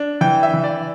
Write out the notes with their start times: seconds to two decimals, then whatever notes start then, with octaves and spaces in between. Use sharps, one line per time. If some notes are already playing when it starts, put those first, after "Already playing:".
Already playing: D4
0.21 E3 G5
0.43 E5
0.53 E3
0.64 D5